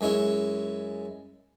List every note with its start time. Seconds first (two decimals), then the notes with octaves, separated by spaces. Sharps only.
0.01 F#2 G#3 C#4 E4